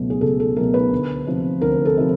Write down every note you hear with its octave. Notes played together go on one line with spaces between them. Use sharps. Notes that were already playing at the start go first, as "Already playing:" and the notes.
Already playing: C#2 B2 F#3 A3
G#4
C#2 A4
A4
B2 F#3 A3 A#4
B4
D2
C3 F3
D2 A#4
A4
C3 F3